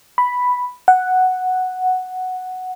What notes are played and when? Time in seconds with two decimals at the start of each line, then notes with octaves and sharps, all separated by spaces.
0.18 B5
0.88 F#5